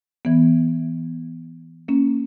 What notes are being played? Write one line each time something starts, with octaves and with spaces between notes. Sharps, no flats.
E3 B3
A#3 C#4